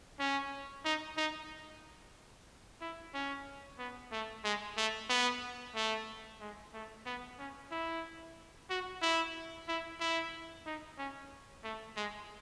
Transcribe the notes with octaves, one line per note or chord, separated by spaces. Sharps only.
C#4
D#4
D#4
E4
C#4
B3
A3
G#3
A3
B3
A3
G#3
A3
B3
C#4
E4
F#4
E4
E4
E4
D#4
C#4
A3
G#3